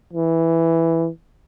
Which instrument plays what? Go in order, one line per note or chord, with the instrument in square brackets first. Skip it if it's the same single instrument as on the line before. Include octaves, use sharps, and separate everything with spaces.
[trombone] E3